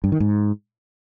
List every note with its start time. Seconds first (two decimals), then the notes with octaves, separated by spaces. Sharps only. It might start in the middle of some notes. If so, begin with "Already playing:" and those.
0.04 G2
0.12 D#3
0.20 G#2